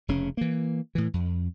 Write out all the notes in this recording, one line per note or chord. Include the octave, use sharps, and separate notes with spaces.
F1 C#3 C#4
E3 A#3
A2 E3
F2